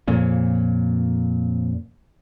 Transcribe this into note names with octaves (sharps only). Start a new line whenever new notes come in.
F2 A#2 C#3